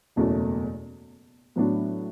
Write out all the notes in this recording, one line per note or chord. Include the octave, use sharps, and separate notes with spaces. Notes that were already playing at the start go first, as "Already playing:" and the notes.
F#1 E2 B2 A3 C#4
A2 F#3 B3 D4 F#4